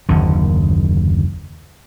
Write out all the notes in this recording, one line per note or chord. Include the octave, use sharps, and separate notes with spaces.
F#1 D#2 D3